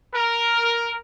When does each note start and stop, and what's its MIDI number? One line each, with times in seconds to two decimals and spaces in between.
0.14 0.97 70